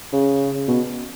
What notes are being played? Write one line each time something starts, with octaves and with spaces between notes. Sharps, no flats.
C#3
B2